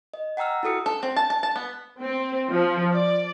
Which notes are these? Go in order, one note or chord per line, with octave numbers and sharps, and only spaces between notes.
D#5
F#5 G5 A#5 E6 F6
E4 F#4 A4 D#6 C#7
A4
C4
A5
A5
A5
B3
C4
F3
D5